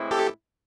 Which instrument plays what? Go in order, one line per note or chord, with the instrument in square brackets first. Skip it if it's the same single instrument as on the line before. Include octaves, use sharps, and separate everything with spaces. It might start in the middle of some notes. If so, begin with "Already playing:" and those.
Already playing: [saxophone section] A2 E3 G#3 C4 E4
[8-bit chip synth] G4 A4